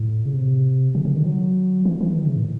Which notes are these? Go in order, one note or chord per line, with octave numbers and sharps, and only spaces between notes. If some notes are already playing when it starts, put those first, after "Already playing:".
Already playing: A2
C#3
C3
C#3
C#3
D#3
F#3
E3
E3
D#3
C#3
A2